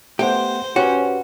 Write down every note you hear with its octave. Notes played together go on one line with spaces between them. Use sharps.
A3 B3 G4 C5 F#5
C#4 F#4 G4 B4